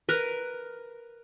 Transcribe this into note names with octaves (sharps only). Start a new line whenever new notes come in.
A#4 B4